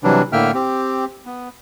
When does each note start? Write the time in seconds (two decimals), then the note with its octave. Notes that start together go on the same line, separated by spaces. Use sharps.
0.04 C3 E3 F#3 G3 D4
0.33 A2 D3 A#3 E5 G5 F6
0.54 C4 G4
1.26 B3